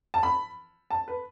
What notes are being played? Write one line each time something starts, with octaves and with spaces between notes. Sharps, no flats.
A5
B5
A5
B4